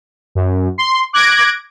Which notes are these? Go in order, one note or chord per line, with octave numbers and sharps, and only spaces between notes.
F#2
C6
D6 F#6 G#6 A#6 D7